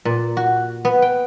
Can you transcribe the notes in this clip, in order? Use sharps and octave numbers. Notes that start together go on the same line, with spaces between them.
A#2
F#4
B3
G5